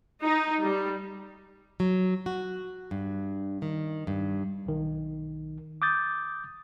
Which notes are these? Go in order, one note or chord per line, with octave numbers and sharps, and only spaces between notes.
D#4
G3
F#3
F#4
G2
D#3
G2
B1 D#3
D6 D#6 G6 A6